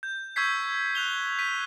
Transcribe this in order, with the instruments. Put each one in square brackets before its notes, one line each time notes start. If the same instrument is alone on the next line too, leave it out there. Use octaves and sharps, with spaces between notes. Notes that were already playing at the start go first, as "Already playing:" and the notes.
[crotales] G6
C#6 E6 G6 G#6 B6 C7
F#6 F7 G7
B6 D#7